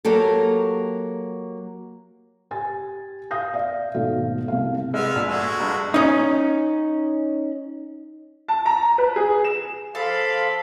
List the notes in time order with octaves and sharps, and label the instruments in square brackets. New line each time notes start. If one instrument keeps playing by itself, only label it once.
[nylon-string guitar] F#3 A#3 G4 A4
[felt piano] G4 G#5 A6
F5 D#6 G6 A#6
D5 E5 F5
G#1 B2 A3 F5
C2 C3 F5
[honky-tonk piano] G#3 [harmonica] B3 E5 F6
[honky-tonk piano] A#1
[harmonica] G#3 A3 F#4 [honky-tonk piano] E6
[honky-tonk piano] G2
[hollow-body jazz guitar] C#4 D#4
[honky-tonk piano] A5
A#5
B4
G#4
E7
[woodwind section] F3 [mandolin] A4 [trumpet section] D5 B5 C6 [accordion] F5